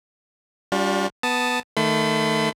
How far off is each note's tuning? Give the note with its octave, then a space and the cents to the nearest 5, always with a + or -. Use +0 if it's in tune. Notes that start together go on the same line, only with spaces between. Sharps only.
G3 +0 D4 -35 F4 +35
B3 +0 A5 +0 D#6 +0
D#3 +0 A3 +5 B5 +45